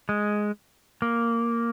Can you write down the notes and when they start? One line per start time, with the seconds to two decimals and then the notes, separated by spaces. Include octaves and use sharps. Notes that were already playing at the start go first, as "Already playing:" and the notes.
0.09 G#3
1.02 A#3